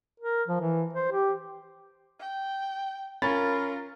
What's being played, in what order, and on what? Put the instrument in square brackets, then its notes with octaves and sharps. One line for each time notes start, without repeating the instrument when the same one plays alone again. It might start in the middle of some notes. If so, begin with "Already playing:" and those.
[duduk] A#4
F3
E3
C5
G4
[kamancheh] G5
[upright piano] C#4 B5 A6 [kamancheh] F4 A#4